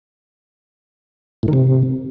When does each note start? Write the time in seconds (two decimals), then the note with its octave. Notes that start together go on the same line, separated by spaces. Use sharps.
1.43 A2
1.48 D#3
1.53 C3